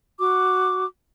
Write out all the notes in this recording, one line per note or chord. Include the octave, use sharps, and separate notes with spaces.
F#4 D6